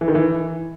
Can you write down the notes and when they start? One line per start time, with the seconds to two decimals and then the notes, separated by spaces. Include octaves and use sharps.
0.01 E3
0.08 D#3
0.15 E3